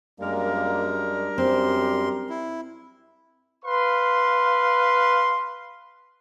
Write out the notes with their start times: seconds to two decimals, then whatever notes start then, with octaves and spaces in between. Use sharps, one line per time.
0.20 F#2 G3 G#3 A#3 D4 A#4
1.38 F#2 C4 G4 C6
2.29 E4
3.65 B4 F5 C6